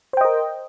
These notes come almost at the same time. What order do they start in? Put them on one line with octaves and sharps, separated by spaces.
C5 G5 D#5 A#4